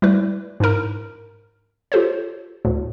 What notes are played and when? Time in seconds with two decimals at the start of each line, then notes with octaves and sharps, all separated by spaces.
0.02 G3 A3 E4 B4 D5
0.60 G#2 D4 E4 A#4 A#5
1.92 F4 G4 A4 C5 C#5
2.65 D2 A2